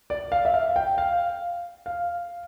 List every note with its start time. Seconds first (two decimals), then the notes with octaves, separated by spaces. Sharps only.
0.10 D5
0.32 F5
0.45 E5
0.54 F5
0.76 G5
0.98 F5
1.86 F5